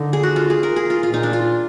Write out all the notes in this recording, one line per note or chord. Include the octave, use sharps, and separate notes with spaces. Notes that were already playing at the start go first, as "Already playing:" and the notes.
Already playing: D3 D#4
G#4
F#4
F4
G#4
A#4
G#4
F4
A#2 F4
D#4
D4
F4